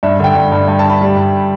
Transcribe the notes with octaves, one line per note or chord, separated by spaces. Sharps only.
G2 E5
D3 G5
G2
G2
G2
A5
G2
B5
G3
G2